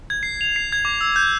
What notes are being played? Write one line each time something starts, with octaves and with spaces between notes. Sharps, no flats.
G#6
C7
F7
C7
G#6
D6
E6
G6